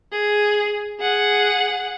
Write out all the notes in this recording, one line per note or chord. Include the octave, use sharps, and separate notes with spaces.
G#4
G#4 F#5